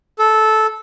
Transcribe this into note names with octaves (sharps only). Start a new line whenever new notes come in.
A4